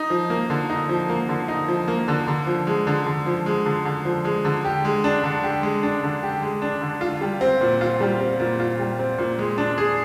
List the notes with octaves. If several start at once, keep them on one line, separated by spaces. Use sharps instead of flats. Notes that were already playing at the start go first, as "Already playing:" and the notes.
Already playing: D#4
F3
A#3
D3
D#4
F3
A#3
D3
D#4
F3
A#3
D3
D3
F3
G#3
D3
D3
F3
G#3
D3
D3
F3
G#3
D3
G4
G#3
D4
D3
G4
G#3
D4
D3
G4
G#3
D4
D3
F4
G3
C4
A#2
F4
G3
C4
A#2
F4
G3
C4
A#2
G#3
D4
G#4